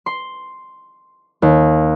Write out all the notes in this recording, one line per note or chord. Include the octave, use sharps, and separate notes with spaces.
C6
D#2